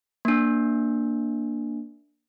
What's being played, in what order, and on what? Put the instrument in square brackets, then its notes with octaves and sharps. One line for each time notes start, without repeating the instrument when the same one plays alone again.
[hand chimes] A#3 D4